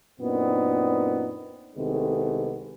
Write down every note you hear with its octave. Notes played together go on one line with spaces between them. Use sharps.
F#2 A#2 B3 C4 D4 D#4
C2 C3 D#3 G#3 A3 B3